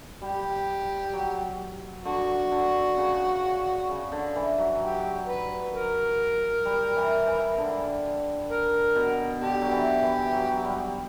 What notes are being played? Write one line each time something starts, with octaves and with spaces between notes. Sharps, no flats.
G3 G4
F#3
D3 F#4
D3
C#3
C#3
D3
E3
F#3
G4
B4
A#4
G3
E3
E3
D3
A#4
B2
D3 G4
F#3
E3
E3
F#3
G3